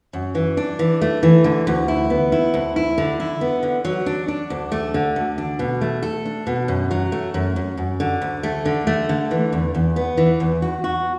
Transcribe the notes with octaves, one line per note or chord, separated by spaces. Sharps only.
F#2
E3
D4
E3
A3
E3
D3
D2
E4
B3
E4
D2
E4
D3
E4
B3
D3
F#3
D4
D4
D2
A3
D3
D2
D4
B2
A3
A4
D4
B2
F#2
F#3
A3
F#2
F#2
F#2
D3
D2
A3
D3
A3
D3
E3
E2
E2
B3
E3
E2
F#4
F#4